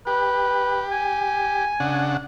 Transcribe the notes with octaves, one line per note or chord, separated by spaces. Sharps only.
G4 B4
G#5
C#3 D4 F#5